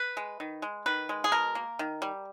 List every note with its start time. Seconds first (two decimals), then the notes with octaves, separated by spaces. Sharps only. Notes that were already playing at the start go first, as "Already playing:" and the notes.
Already playing: B4
0.17 G#3
0.40 D#3
0.62 G#3
0.86 D#3 B4
1.09 G#3
1.24 G#4
1.32 B2 A#4
1.55 A#3
1.79 D#3
2.02 G3